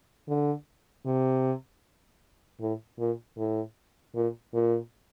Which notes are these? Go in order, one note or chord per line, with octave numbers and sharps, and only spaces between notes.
D3
C3
A2
A#2
A2
A#2
A#2